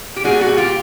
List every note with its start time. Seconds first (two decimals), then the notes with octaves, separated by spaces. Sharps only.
0.16 G4
0.24 A#2 G3 F#4 G#4
0.41 F#4 G#4
0.57 F4 G4